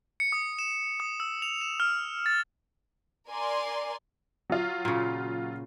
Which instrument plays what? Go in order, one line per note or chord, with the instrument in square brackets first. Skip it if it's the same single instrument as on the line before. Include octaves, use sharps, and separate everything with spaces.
[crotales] C#7
D#6
E7
D#6
E6
F7
E7
F6
A6
[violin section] A#4 D5 G#5 C6
[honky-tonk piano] F#3 F4
[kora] A#2 C#3